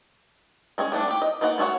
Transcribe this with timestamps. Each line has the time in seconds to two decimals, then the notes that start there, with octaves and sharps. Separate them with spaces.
0.78 G#3 C#4 G#4
0.92 G3 A3 B3 D4
1.08 A3 G4
1.22 D#5
1.41 A#3 D#4 B4 D5 F#5
1.58 A3 F#4 G#4 C#5 F#5